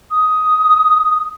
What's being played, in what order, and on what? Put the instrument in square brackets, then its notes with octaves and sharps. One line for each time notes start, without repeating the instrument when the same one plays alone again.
[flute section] D#6